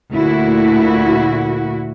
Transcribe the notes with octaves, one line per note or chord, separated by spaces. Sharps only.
D2 A#2 E4 F#4